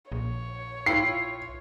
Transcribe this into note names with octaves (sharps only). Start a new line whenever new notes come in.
A#1 C#5
E4 F4 G5 C7